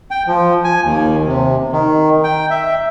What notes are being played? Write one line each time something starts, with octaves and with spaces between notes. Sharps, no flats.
G5
F3
G#5
D#2
C3
D#3
G5
E5